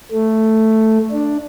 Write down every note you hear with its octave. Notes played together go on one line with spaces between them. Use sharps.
A3
D4